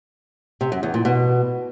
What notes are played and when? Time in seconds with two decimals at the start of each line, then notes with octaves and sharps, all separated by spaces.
0.61 C3
0.72 F#2
0.83 E2
0.94 A#2
1.05 B2